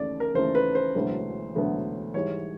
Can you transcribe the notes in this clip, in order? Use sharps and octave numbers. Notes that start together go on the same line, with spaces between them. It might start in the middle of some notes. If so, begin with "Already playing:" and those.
Already playing: D#2 C#3 E3 A3 D5
A#4
D#2 C#3 E3 A3 C5
B4
C5
E1 D2 D3 F#3 B3
E1 D2 D3 F#3 B3
G#2 E3 G3 C#5